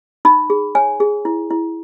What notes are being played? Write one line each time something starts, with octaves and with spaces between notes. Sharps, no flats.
D#4 B5
G#4
C#5 G#5
G#4
E4
E4